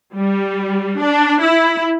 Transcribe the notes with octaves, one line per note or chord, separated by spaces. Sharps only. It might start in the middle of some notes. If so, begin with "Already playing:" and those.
G3
D4
E4